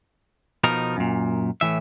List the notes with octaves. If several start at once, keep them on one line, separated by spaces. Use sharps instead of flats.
B2 F3 D#4 A#4
F#2 A#2
A2 E3 E5